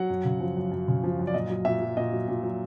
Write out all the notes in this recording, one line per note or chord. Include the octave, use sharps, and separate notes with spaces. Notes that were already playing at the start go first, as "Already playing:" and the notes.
Already playing: F#3 F#5
F#2
C#3
F3
F#2
F#2
C#3
F3
F#2
D5
A#2 D#5
F#3
A#2 E5
F#3
A#2 D#5
F#3
A#2
F#3